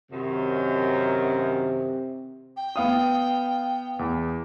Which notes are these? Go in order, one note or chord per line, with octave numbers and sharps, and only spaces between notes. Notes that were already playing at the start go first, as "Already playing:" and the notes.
F#2 C3 D#3
G5
B3 F5 D#6
E2